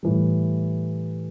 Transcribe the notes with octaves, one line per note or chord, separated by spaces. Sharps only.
A2 E3 G3